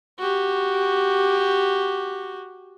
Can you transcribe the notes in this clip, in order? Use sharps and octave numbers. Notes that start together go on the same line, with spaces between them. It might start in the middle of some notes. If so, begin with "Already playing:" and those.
F#4 G4